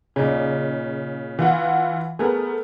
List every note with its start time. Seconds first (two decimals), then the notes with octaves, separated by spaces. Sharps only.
0.16 A#2 C#3 D#4 G#4
1.39 E3 F4 F#5
2.19 A3 B3 G#4 A#4